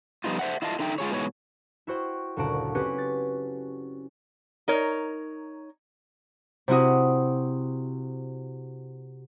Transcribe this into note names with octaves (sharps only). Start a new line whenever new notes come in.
F3 G3 B3 D#4 F4
C5 E5 F#5
E4 F4 D#5 F5 A5
D3 D#4 E5 G5
G#3 F4 G#4 C#5
G#2 B2 E3 G#3 G#4 C#5
E4 F#4 C5 G5
F#1 D2 A#2 F#4 A5 D7
C4 C#4 F#4 G4 B4
A6
D#4 A#4 C#5
C3 C4 E4 F#4 D#6